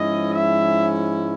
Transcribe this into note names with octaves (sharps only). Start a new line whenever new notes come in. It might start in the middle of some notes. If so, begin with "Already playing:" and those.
Already playing: G#2 F3 G#3 C#4 E4 D#5
E5